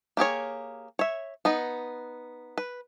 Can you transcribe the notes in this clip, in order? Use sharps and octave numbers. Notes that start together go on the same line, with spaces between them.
A#3 G4 G#4 C#5
C#5 E5
B3 D#4 B4
B4